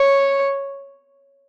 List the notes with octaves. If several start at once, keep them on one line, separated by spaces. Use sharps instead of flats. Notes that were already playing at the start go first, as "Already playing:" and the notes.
Already playing: C#5